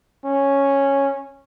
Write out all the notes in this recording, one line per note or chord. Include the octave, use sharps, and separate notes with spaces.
C#4